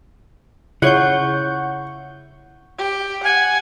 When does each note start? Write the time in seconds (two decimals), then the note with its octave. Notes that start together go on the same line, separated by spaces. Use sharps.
0.82 C#3 E4 F4 C#5 F#5 C#6 G6
2.78 G4
3.24 F#5 G#5